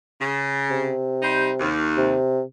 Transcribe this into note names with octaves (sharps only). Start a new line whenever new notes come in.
C#3
C3
G3 D#4 C5
D#2
C3